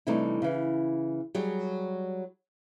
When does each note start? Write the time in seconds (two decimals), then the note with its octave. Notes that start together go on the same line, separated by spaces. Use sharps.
0.07 C3 E3 G3 A3 D4 D#4
0.42 C#3 E3
1.35 F#3 G3 G4 G#4